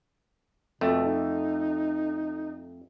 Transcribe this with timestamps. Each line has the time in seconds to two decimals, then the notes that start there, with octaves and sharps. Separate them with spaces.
0.81 F2 B2 A3
1.04 D#4